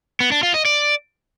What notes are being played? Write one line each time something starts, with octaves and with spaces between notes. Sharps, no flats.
B3
D4
F4
D#5
D5